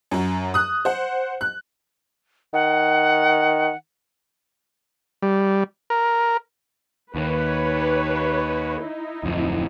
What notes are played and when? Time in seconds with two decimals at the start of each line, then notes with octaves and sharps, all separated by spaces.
0.11 F#2 F#3
0.54 D#6 F#6
0.85 C5 F#5
1.41 F#6
2.54 D#3 F#5
5.22 G3
5.90 A#4
7.15 D#2 D#3 B4 C#5
8.81 D#4 E4
9.23 D1 F2